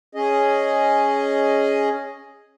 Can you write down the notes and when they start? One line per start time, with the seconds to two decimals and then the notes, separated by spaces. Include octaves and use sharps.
0.15 C#4 G#4 D#5